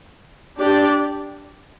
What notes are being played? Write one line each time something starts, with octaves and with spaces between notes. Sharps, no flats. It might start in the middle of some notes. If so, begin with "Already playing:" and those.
D4 G4 D5